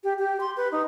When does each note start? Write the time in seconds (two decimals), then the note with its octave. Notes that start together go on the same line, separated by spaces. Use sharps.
0.04 G4
0.19 G4
0.40 C6
0.57 B4
0.72 D#4